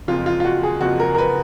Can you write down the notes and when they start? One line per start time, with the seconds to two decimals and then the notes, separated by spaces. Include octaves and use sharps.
0.08 F#1 F2 F3 F4
0.26 F4
0.40 F4
0.44 F#4
0.63 G#4
0.81 F#1 F2 F3 F#4
1.00 A#4
1.15 A#4
1.18 B4